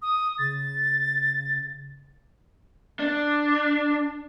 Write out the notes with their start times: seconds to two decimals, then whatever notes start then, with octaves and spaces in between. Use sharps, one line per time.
0.02 D#6
0.38 C#3 A6
2.99 D4